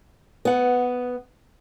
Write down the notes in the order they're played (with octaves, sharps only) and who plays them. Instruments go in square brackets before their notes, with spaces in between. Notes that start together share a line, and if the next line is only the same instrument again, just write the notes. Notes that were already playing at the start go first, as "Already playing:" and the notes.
[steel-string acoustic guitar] B3 F#5